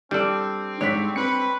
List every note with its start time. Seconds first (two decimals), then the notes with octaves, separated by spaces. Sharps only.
0.11 G3 C4 D4 A4 D5
0.81 G#2 D4 C#5 B6
1.16 C4 B4 C#7